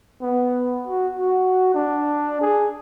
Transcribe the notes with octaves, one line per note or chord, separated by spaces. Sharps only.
B3
F#4
F#4
D4
G#4